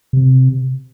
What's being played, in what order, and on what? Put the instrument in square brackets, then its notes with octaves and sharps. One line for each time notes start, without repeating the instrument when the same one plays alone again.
[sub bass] C3